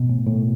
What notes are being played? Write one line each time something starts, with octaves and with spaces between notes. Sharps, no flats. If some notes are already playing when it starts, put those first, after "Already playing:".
Already playing: B2
A2
A2